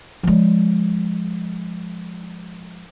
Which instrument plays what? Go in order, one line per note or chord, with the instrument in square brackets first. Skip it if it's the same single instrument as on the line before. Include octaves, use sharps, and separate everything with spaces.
[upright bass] F3 G#3